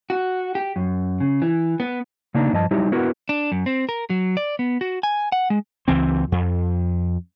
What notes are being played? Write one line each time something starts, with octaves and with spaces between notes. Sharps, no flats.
F#4
G4
F#2
C#3
E3
B3
C#3 A#3 D4 D#4
G2 F3 D#5 A5
F#3 G3 D#4 E4 G4
B3 E4 F#4 A#4 B4
D4
F#2
C4
A#4
F#3
D5
B3
F#4
G#5
F#5
G#3
C#2 E3 C4
F2